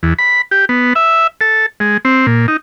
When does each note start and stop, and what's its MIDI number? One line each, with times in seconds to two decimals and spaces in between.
0.03 0.14 40
0.19 0.42 83
0.51 0.65 67
0.69 0.93 59
0.96 1.27 76
1.41 1.66 69
1.80 1.97 56
2.05 2.26 60
2.27 2.46 46
2.48 2.57 63